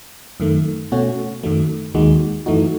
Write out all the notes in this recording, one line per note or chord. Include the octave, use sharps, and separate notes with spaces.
F#2 D#3 A3
B2 A3 C#4 F#4
F#2 D#3 F#3 A3
D#2 D#3 G#3 D#4 F#4
F#2 E3 A3 D#4 F#4